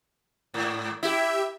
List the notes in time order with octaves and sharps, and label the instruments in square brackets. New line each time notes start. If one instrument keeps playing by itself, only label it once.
[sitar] G#2
[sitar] E4 [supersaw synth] G4 E5